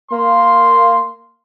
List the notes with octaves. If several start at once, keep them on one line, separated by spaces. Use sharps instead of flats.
A#3 C6